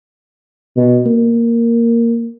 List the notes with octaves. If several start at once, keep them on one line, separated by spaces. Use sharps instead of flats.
B2
A#3